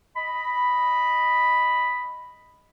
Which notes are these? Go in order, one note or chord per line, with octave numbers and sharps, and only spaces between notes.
D#5 B5